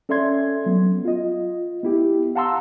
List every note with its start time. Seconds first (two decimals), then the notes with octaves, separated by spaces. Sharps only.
0.09 C#4 A4 D5 E5 C6 G#6
0.66 F#3 B3
1.05 F4 D#5
1.83 B3 E4 G4
2.35 F5 F#5 A5 A#5 C6 E6